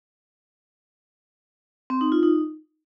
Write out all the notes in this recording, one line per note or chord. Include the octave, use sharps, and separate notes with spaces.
C4
D#4
F4
D#4